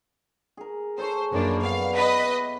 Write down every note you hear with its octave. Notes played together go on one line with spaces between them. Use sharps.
G#4 A#4
G#4 A4 C5 C#5
F#2 F3 A#3 D4 E4 C#5
B3 D5 F5
B4 D#5